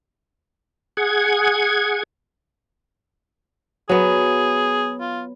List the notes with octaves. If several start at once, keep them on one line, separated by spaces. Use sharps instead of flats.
G#4 F#5 G#6
F#3 B3 G#4
F4